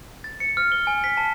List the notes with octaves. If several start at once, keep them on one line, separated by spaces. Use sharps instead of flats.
A6
C#7
F6
G7
G#5
B6
A5